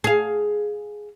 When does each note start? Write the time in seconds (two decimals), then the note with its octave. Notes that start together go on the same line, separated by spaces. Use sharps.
0.04 G#4 F5